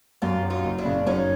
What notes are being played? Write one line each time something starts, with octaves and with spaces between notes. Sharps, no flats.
F#2 F4 G4
F#3
D#4 F4
F#1
D4 E4
C#3
F#2 C#4 D#4